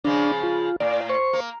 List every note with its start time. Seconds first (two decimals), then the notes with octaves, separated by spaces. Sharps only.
0.04 C#3 F3 G#3 D4
0.43 F4
0.80 A2 D5
1.09 C5 C#6
1.33 A#3